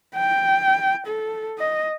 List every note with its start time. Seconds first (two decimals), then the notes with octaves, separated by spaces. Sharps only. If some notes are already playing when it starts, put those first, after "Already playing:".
0.16 G5
1.07 A4
1.59 D#5